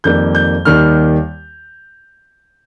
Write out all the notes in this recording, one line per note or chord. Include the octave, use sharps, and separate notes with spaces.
F2 D#3 G3 A#3 G6
G6
D#2 D#3 G3 F6